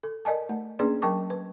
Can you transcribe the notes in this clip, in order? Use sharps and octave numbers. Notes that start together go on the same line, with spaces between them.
A4
A#4 D5 D#5 G#5 A5
A3
A#3 C#4 D4 G#4 B4 D5
F#3 A#4 G5 A5 C#6 D6
B4